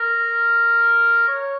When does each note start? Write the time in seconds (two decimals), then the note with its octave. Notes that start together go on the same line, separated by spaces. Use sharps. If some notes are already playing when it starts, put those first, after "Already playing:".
Already playing: A#4
1.28 C#5